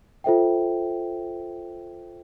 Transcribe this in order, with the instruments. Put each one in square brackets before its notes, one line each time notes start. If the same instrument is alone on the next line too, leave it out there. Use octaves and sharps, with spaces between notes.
[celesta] F4 A4 C5 E5 G5